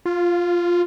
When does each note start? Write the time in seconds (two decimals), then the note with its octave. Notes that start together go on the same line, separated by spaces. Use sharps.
0.06 F4